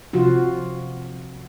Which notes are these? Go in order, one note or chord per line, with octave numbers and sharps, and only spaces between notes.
C3 F3 F4 F#4